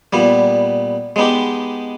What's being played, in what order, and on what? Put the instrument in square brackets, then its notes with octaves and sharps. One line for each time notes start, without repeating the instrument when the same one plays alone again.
[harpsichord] A#2 G3 B3
G#3 B3 D#4 G4